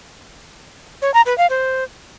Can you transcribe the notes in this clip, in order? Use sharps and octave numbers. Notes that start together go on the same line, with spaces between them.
C#5
A#5
B4
F5
C5